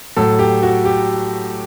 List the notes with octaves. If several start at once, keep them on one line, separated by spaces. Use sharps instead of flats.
A2 F#3 A4
G4
F#4
G4